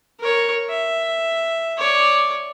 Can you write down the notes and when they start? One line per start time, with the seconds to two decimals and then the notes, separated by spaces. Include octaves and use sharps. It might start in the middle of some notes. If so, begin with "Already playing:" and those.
0.20 A#4 C#5
0.70 E5
1.78 C#5 D5